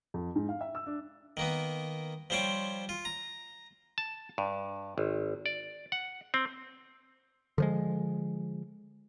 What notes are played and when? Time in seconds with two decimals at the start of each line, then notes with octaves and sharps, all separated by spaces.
0.14 F2
0.36 G#2
0.49 F5
0.61 E5
0.75 E6
0.86 D4
1.37 D#3 A#3 B3
2.30 F3 G3 C5 C#5 G5
2.89 F4
3.05 A#5
3.98 A5
4.38 G2
4.98 G#1
5.46 D5
5.92 F#5
6.34 C4
7.58 D3 F3 G#3